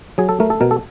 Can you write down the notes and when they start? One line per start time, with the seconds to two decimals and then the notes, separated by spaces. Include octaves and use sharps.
0.18 F#3 G#4
0.29 A4
0.40 A3 A#4
0.50 A4
0.61 B2 A#4
0.71 A4